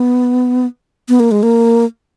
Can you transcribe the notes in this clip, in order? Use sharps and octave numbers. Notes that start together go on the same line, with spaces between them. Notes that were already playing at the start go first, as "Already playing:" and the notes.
Already playing: B3
B3
A#3
G#3
A#3